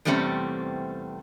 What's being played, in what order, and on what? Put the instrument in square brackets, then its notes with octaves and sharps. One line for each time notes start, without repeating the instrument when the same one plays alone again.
[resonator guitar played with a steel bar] E2 C3 G3 A3 C4 C#4